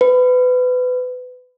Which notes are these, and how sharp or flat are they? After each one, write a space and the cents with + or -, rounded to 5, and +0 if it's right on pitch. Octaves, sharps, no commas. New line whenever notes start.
B4 +25